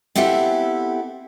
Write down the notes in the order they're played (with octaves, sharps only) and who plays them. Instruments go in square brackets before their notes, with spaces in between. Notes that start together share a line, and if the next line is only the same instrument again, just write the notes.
[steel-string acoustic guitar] B3 C4 E4 G4 A4 E5